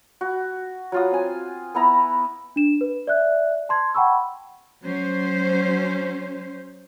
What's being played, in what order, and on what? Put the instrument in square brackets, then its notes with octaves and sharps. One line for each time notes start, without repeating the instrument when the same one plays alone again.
[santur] F#4
F#3 F4 D#6
C4 G#5
B3 E4 A#5
[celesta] D4 E7
B4
D5 E5 F#6
A5 C6 G#6
F#5 G5 A5 B5 C#6 E6
[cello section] F#3 C#4 C5